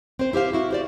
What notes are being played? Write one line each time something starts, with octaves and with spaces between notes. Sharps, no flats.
C4 C5
E4 G4 C5 F5
E4 F#4
G4 C5 D5